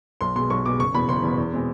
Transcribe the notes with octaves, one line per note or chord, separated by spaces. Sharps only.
B1 C6
B2 G#3 C6
B1 C#6
B2 G#3 D6
F#1 C#6
E2 B2 B5
F#1 C6
E2 B2
E2
B2 G#3 C4